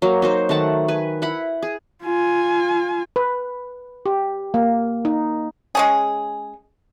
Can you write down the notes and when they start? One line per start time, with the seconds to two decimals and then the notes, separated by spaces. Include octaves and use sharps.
0.02 F#3 A#3
0.22 D#4 F#4 C5
0.49 D#3 A3 F#5 A5
0.88 B4 G#5
1.22 E4 F#5 B5
1.62 G#4
2.04 F4 G#5
3.16 B4
4.06 G4
4.54 A#3
5.05 D#4
5.75 G#3 C#4 G#4